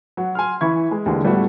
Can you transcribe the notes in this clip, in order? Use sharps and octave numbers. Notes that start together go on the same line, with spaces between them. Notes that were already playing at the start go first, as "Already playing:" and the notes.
F#3 F#4
G#5 C6 F6
E3 E4 B5 C#6 G#6
G#3
D#2 D3 E3 G#3
A2 G3 A3 B3 E4 F#4